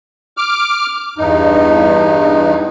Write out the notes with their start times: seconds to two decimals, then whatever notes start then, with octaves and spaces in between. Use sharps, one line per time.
0.37 D6 F6
1.18 E2 G2 D#4